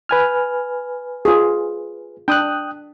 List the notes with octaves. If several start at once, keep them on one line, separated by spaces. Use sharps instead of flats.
B4 G#5 F6
F4 G#4
D4 G5 D#6 F#6